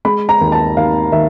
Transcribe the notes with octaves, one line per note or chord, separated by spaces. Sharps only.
G#3 B5
A#5
D#2
A5
D#2 F5
D#3 E5